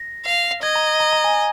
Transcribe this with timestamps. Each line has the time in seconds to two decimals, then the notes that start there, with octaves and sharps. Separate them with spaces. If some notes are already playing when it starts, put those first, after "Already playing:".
Already playing: A#6
0.25 F5
0.62 D#5 G#6
0.75 A#5
1.00 A#5
1.13 A#5
1.24 G#5